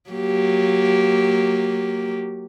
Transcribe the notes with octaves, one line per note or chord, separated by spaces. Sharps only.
F#3 A#3 G4